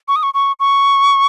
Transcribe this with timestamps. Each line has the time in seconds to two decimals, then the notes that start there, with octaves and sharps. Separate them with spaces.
0.08 C#6
0.16 D#6
0.23 C#6
0.34 C#6
0.60 C#6